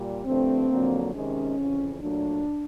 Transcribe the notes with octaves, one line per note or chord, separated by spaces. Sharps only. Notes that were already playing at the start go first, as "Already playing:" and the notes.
Already playing: A#2 G3
G2 D3 F3 A3 C4
F2 D3 F#3 A#3
C3 D#3 G#3 C#4
F2 C#3 E3
A#2 F#3 A3 D4